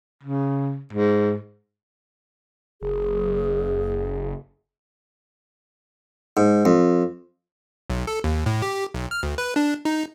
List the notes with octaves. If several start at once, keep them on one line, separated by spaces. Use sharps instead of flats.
C#3
G#2
F#1 G#4
G#2
F2
B1
A4
D#2
A2
G4
B1
F6
D2
B4
D4
D#4